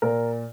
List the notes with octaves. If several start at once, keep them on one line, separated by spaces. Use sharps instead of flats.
A#2 A#4